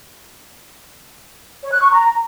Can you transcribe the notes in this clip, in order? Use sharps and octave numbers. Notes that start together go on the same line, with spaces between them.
C#5
F#6
C#6
A#5